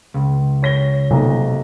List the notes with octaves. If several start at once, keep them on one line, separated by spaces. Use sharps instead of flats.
C#2
C#5 A#6 G7
B1 C3 A#3